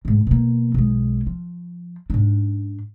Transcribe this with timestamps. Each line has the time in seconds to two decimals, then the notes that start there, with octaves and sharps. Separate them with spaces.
0.05 D2 G#2
0.27 B2 A#3
0.74 B1 G#3
1.26 F3
2.10 G#2 D4